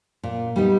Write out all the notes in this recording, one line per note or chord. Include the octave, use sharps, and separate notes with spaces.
A#2
G3 B3 D#4